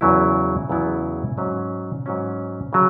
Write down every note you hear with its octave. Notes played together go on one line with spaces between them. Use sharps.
E2 C#3 F#3 B3 E4
E2 C#3 F#3 B3 E4
G#2 F#3 C#4
G#2 F#3 C#4
C#3 F#3